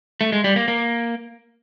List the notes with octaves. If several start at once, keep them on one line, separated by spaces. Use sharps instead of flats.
A3
G#3
G3
A#3
A#3